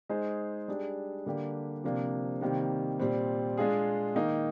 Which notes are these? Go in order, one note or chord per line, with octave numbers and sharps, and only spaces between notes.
G#3 D#4 G#4 C5 D#5
G3 D4 G#4
D3 G3 A#3 D4 G4
C3 F3 A#3 D4
C3 D#3 G3 A#3
A#2 G3 C4
G#3 D4 F4 G#4
D#3 A#3 D#4